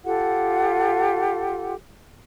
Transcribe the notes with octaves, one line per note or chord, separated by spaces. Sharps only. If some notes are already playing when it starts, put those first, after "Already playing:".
F4 G4 A4 F#5